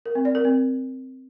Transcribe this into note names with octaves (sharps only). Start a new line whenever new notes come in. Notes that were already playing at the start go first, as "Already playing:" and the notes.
A#4
C4
D5
A#4
C4